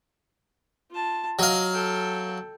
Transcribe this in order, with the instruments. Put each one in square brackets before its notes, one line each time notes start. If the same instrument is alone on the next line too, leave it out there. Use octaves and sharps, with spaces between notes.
[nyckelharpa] F4 A5
[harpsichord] F#3 F5 [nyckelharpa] D#5
[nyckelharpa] A4 G5